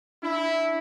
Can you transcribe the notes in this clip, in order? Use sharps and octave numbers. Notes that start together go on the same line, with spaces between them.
D4 E4